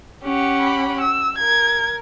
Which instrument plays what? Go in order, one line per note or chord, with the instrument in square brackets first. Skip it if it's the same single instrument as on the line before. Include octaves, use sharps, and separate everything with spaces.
[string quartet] C#4 G4 F#5
[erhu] B5
E6
[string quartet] A#4 [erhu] G#6